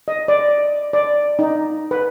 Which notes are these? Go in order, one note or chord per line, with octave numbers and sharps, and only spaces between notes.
D#5
D5
D5
D#4
B4